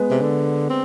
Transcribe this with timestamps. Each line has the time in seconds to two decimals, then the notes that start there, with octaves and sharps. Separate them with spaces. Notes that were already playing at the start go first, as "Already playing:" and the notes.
Already playing: G#3 B3
0.10 C3
0.22 D3
0.69 C4